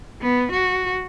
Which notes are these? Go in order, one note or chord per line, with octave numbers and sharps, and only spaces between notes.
B3
F#4